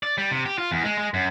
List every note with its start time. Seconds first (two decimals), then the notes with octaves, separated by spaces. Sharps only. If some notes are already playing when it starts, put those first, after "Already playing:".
0.03 D5
0.18 G3
0.32 C3
0.46 G4
0.58 F4
0.71 E2
0.84 G#3
0.98 G#3
1.14 F#2